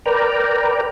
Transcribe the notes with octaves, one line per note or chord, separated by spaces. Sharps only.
A#4 B4 D5 G5 A#5